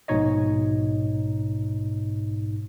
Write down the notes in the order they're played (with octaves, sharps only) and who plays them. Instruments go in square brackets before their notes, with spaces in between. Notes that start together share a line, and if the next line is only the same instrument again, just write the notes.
[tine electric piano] A#1 G#2 B2 D#4 C#5 D#5